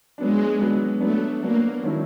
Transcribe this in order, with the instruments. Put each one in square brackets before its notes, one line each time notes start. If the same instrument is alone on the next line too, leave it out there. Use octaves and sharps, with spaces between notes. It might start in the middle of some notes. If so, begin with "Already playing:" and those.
[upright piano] F#3 B3 D4 [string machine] G#3
[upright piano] F#3 B3 D4
[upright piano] F#3 B3 D4 [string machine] A3
[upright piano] F#3 B3 D4 [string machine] A#3
[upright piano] D#3 F#3 A3 C#4 E4